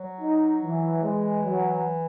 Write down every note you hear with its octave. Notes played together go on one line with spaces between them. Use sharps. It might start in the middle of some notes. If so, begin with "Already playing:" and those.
Already playing: F#3
D#4
E3
E3 G#3
F#3